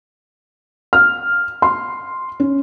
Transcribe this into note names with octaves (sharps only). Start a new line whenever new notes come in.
F6
C6
C#4